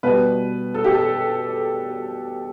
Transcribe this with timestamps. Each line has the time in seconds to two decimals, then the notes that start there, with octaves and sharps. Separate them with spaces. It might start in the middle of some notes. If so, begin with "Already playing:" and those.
0.03 B2 G3 B4
0.75 A4
0.84 G4
0.94 A4